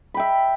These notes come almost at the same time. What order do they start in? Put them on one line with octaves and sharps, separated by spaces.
B5 G5 E5